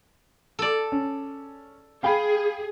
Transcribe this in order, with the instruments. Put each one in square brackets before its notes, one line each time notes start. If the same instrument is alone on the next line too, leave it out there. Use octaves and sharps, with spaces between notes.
[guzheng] A4 D5
[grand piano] C#4
[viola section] G#4 [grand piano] F5 G5 B5